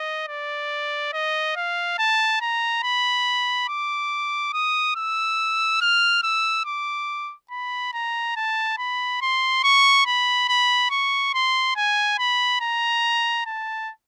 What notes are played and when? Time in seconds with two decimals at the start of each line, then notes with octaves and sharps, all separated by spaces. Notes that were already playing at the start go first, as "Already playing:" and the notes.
Already playing: D#5
0.28 D5
1.13 D#5
1.56 F5
1.98 A5
2.41 A#5
2.83 B5
3.68 D6
4.53 D#6
4.96 E6
5.81 F6
6.23 E6
6.65 D6
7.51 B5
7.93 A#5
8.36 A5
8.78 B5
9.22 C6
9.63 C#6
10.06 B5
10.49 B5
10.91 C#6
11.34 C6
11.76 G#5
12.19 B5
12.61 A#5
13.46 A5